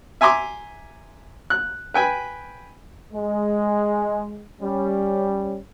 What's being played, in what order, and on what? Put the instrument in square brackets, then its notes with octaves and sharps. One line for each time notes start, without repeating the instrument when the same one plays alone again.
[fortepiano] E5 G#5 A#5 C6 D6
F#6
B4 G5 G#5 B5
[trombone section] G#3
G3 C#4